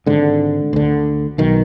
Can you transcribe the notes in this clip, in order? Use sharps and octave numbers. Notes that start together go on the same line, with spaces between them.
G#1 G#2 D3
D2 D3
B1 B2 D#3